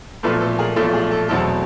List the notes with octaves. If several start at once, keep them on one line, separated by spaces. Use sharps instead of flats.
B1 A#2 F3 A3 A4 B4
A4 B4
G#4 A#4
B1 A#2 F3 A3 A4
G#4
A4
E2 B2 F#3 A3 C4 A4